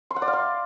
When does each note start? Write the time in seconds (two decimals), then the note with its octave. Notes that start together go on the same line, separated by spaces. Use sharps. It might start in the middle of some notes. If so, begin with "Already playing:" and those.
0.11 C6
0.16 F#5
0.22 D5
0.28 F5
0.33 C6